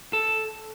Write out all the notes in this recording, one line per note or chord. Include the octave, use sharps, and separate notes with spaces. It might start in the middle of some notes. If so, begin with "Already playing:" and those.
A4